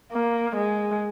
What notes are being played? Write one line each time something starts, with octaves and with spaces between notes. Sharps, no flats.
A#3
G#3